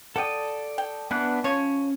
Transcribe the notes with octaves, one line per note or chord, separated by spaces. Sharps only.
A4 D5 F#5 G5 D#6
G5
E3 B3 D4 F#6
F3 C#4 C#5